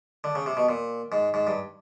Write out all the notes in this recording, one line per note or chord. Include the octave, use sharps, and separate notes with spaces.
D3
C#3
C3
B2
A#2
G#2
G#2
G2